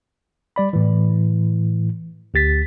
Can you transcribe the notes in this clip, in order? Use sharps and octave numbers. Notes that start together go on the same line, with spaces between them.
G3 D5 B5
A2 E3
D2 G4 A6 B6